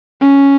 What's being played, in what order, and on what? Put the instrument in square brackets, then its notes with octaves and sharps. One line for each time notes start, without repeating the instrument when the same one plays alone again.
[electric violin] C#4